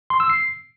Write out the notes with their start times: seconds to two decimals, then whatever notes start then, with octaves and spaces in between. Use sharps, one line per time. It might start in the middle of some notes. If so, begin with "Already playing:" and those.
0.10 C6
0.20 E6
0.30 C7